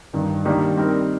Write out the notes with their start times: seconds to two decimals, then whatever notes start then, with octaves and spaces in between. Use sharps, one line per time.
0.13 G2 D#3 G3
0.45 D#3 G3 A#3 D4
0.77 G3 C4 D#4 A#4